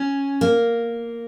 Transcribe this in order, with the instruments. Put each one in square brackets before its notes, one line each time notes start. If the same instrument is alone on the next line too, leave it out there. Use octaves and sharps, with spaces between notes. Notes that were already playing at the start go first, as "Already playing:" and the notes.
Already playing: [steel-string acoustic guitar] C#4
A#3